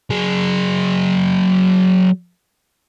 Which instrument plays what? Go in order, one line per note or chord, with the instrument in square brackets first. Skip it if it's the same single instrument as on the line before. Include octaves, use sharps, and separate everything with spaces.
[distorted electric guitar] F#3 G#4